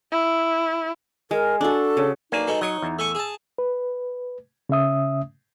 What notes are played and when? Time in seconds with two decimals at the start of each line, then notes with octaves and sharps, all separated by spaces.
0.12 E4
1.31 G#3 A#4
1.61 D4 F#4 A4
1.97 C#3
2.32 B1 A#3 D4 D#4 G#5
2.47 B2 G#3 A4
2.61 F#3 C#5 D#5
2.82 E2
2.99 A3 G#5 C#6 E6
3.15 G#4 A5
3.58 B4
4.69 C#3 C#4 E5 D#6